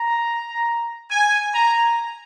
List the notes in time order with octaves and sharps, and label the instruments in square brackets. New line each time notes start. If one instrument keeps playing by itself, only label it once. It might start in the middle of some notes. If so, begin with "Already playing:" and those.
Already playing: [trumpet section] A#5
G#5
A#5